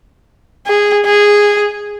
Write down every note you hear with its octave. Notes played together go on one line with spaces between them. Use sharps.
G#4
G#4